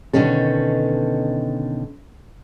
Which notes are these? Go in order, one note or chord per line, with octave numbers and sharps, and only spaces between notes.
B2 D3 D#3 C#4 A4